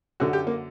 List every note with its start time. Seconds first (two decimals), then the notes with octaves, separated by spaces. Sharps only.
0.20 F#2 D3 F#4
0.33 G4
0.47 A#3